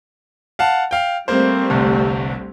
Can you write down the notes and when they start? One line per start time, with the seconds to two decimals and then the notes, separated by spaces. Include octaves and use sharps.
0.59 F5 F#5 A5
0.91 F5 G5
1.28 G3 A3 A#3 C4 C5
1.70 G1 C2